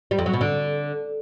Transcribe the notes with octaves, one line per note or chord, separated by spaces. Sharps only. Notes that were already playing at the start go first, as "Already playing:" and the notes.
G3
F2
F#3
B2
D3